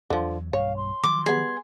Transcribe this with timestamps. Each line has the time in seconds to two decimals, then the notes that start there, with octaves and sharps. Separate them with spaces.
0.10 E2 D3 F3 F#3
0.53 B1 G2 C#5 F5
0.77 C6
1.04 D#3 F3 F#3 D6
1.26 G3 B3 G#4